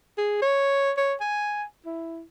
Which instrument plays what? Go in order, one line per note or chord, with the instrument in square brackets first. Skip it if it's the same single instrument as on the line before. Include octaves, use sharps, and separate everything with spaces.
[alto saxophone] G#4
C#5
C#5
G#5
E4